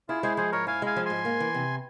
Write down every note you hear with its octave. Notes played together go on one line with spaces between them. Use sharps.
E4 F4 G#4
G#3 G#4 C5
F3 G#4 C5
G#2 A#4 C#5
E4 F5 G#5
G#3 F5 G#5
F3
G#2 G#5 C6
A#3
E3
C3